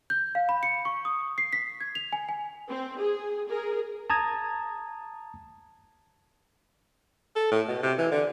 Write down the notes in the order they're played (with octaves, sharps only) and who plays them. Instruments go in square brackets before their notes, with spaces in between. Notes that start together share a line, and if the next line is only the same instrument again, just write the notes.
[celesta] G6
F5
B5
C#7
C#6
D#6
C7
B6
G#6
F7
G#5
G#5
[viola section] C4
G#4
G#4 A#4
[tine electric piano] A5 A#5 D#6 G#6
[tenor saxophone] A4
A2
B2
C3
E3
D3